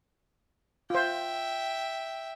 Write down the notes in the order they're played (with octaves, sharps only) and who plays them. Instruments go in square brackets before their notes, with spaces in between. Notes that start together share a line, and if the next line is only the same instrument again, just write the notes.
[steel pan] F4 C5 [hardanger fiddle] E5 G5